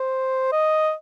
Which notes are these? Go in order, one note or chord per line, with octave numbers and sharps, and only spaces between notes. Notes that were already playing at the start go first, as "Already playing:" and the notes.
Already playing: C5
D#5